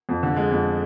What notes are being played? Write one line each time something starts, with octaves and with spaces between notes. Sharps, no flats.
F2
D3
G#3
F2